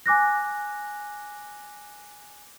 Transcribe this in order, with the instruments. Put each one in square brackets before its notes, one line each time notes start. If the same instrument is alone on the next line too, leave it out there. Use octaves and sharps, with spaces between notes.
[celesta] G#5 D6 F#6 A#6